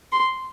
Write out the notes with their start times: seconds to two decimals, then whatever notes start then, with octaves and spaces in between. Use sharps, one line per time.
0.12 C6